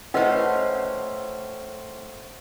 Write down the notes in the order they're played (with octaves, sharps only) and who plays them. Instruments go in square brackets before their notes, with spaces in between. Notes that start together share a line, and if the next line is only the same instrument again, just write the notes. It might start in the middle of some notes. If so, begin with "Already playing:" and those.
[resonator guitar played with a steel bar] A2 C#4 [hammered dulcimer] F#4 C5 E5 [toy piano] B4 D#5 F#5